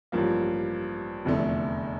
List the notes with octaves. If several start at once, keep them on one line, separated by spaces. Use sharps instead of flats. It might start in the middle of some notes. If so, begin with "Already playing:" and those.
A1 G2 F3 A#3
F1 E2 D3 A3